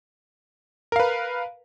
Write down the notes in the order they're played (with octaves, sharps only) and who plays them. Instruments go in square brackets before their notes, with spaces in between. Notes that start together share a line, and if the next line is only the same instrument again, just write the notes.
[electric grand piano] A#4
F5
B4